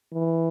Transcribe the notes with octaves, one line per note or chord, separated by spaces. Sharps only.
E3